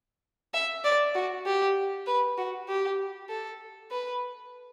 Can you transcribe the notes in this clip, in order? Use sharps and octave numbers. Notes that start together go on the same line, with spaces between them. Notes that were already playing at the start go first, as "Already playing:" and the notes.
E5
D5
F#4
G4
B4
F#4
G4
A4
B4